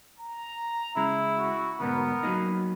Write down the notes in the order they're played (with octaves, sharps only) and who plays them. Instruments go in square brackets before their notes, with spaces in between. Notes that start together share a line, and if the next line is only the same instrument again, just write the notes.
[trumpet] A#5
[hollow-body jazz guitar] C#3 G#3 [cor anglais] E4
[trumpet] F#4
[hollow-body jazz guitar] D2 G#2 B2 [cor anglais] B3 [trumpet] A#4
[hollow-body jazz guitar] F#3 A#3 D#4